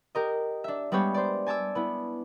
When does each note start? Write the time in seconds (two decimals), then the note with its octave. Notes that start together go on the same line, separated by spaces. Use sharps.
0.15 G4 A#4 D#5
0.64 D4 E5
0.92 G3 G#3 B3 D4 G4 C#5
1.14 C5 D5
1.46 G#5 A5 D6 E6
1.75 B3 E4